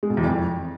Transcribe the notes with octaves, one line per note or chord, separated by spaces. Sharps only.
G#3
B2
E2
F2